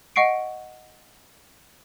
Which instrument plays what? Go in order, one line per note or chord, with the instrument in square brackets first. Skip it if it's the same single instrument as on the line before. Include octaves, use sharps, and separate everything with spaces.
[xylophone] D#5 F#5 C#6 C7 D7